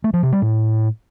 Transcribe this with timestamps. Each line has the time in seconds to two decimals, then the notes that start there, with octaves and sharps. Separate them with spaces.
0.04 A3
0.14 F3
0.23 C3
0.32 G3
0.42 A2